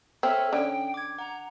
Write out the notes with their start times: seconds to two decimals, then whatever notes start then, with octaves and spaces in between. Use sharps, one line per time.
0.23 C4 A4 C#5 E5 F6
0.53 D3 C#4 G5
0.94 D6 G#6
1.19 F#5 A#5